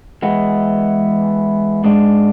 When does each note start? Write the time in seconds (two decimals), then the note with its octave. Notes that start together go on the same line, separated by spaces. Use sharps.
0.22 E3 G#3 B3
1.84 G#2 G#3 D4